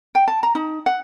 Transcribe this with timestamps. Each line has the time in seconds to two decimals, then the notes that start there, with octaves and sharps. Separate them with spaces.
0.15 G5
0.28 A5
0.43 A#5
0.55 D#4
0.86 F#5